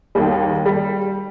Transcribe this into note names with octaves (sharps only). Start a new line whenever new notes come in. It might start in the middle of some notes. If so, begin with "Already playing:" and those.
D#2 D#3 G3
G3